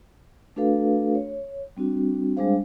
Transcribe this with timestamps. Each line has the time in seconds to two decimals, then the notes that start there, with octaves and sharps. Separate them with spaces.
0.56 A3 D4 F#4 A4 B4 F5
1.15 C#5
1.77 G3 C4 D4 F#4
2.37 G3 G#3 D4 G#4 C5 F5